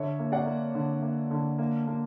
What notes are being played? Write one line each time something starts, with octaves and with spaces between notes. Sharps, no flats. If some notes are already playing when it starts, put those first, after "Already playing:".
Already playing: D3 C#5 E5
A#3
D5 F#5
A#3
D3
A#3
D3
A#3
A#3